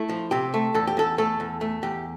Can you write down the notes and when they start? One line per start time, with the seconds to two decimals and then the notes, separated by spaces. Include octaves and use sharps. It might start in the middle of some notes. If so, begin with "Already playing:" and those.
Already playing: A3 E4
0.09 F3
0.31 C3 G4
0.54 A3
0.74 E2 A4
0.87 G4
0.97 E2 A4
1.18 A3 A4
1.40 E2
1.61 A3
1.83 E2 G4